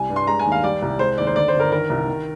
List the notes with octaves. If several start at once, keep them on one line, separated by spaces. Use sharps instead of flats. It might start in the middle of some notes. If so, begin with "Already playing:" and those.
Already playing: C2 G3 G#5
G2
C6
G#3 A#5
G#5
D#2
F5
G3 D5
C2
G#3 C5
D#2 D5
C5
D3 D5
C5
G1
A#4
D#3 A#4
C2
D#3